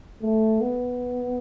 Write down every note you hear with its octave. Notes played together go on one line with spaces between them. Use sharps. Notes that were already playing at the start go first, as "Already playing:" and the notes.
A3
B3